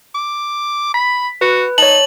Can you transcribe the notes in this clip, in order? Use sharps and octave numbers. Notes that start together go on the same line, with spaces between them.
D6
B5 B6
F#4 B4
D#4 C#5 A5 F#7